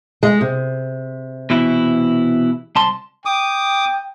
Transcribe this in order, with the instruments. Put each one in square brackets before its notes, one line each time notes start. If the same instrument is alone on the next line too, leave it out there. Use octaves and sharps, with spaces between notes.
[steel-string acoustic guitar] G#3
C3
[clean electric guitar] B2 E3 E4
C2 A5 C6
[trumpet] G5 [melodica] D6 D#6